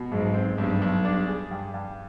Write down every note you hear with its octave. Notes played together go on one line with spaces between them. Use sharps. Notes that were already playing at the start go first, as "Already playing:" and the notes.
Already playing: B2
B1 G#2
C4
B1 G2 G3
B1
G2 G3 D4
G#4
G2
G2